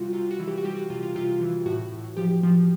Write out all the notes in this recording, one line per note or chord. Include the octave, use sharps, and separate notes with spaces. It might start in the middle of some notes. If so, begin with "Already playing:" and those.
Already playing: C3 G3 F4 F#4
C3 F4
F#4
E3
G4
F#4
G3 G4
F#4
C3 F4
F4
C3 F4
E3
A2 F#4
A2
F3 G4
F3